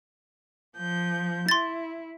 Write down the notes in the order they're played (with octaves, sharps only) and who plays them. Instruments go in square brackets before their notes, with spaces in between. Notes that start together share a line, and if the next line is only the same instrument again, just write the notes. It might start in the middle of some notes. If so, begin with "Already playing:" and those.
[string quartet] F3 G6
[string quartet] E4 [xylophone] C6 A6